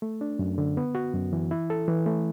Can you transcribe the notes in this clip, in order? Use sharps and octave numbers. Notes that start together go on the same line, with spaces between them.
A3
D4
F#2
D3
B3
F#4
F#2
E3
E4
A4
E3
A3